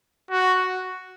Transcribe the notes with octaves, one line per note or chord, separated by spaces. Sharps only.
F#4